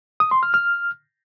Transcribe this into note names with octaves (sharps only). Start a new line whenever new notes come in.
D#6
C6
F6
F6